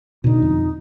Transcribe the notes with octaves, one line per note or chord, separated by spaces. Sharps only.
B2 D3 D#4
F2